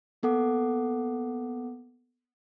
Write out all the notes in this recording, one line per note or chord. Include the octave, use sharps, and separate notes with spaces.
A#3 B3 A4 F#5 D6